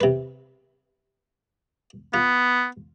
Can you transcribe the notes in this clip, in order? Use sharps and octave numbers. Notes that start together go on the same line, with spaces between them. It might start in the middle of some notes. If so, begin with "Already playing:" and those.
C3 B4
B3 F4